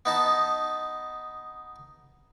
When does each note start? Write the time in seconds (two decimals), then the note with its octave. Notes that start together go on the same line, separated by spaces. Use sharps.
0.05 B3 D#4 A5